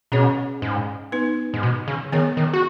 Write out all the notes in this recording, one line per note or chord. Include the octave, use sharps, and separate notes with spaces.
B2 C#4 G#4 C#5
G#2
B3 D#4 B4
G#2
B2
C#3
D#3 B3 G#4 C#5
D#3
F#4